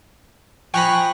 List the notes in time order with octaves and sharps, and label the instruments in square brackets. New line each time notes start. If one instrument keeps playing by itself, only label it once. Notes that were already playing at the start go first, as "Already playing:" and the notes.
[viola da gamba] F3 [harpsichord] G5 A#5 B5 [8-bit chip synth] G#5 C#6 F#6